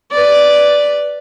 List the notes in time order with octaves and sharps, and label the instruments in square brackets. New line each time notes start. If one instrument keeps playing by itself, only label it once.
[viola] B4 D5